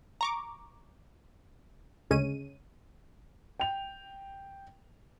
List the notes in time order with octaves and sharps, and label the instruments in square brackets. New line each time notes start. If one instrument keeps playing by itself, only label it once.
[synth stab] A#5 C#6 D6
D2 C#3 G#3 C#4 D#7
[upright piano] G5 F7